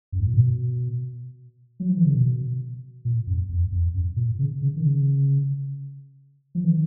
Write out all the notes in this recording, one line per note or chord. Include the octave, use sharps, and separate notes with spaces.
F#2
G#2
A#2
B2
F#3
F3
D#3
C#3
B2
A#2
F#2
F2
F2
F#2
A#2
C#3
C#3
D#3
C#3
F3
D#3